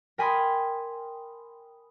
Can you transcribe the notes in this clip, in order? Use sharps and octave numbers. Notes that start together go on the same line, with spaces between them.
A#4 G5 G#5 B5 C6 D#6